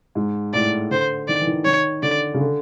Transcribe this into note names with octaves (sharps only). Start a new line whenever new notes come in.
G#2
A2 D5
D3 C5
D#3 D5
E3
D#3
E3
D#3 C#5
D3 D5
C#3
D3